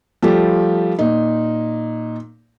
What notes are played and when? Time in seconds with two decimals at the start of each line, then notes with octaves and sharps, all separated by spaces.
0.22 F3 G3 A3 F4 G4
0.99 A#2 D#4